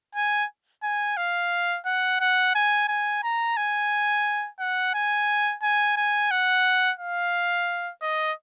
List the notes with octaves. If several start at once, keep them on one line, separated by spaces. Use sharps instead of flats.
G#5
G#5
F5
F#5
F#5
G#5
G#5
A#5
G#5
F#5
G#5
G#5
G#5
F#5
F5
D#5